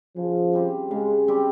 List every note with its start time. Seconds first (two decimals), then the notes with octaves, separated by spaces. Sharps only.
0.16 C#3 F3
0.53 G3 C4 G4
0.90 C#3 G#3
1.28 G3 C4 G4